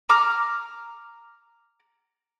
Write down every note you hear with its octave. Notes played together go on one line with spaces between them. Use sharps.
A#5 D6 F6